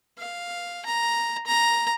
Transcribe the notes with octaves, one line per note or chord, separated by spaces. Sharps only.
F5
A#5
A#5